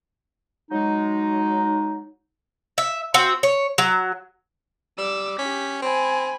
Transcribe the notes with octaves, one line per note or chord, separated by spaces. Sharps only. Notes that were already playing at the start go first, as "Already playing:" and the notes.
F#3 G#3 D#4
E5
C4 F#4
C#5
F#3
G3 D6 E6
C#4 G4 B6
C4 G#5 B5